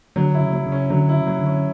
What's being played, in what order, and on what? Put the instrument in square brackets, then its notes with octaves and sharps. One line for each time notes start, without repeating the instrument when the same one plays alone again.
[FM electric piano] D3 [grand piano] F#3
[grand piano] E4
[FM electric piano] C#3
[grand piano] F#3
[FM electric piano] C#3
[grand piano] C#4
[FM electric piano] D3 [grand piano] F#3
[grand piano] E4
[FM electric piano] C#3
[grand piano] F#3
[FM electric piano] D3
[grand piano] C#4